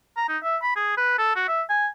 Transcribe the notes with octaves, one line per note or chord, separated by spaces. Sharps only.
A#5
D#4
E5
B5
G#4
B4
A4
F#4
E5
G#5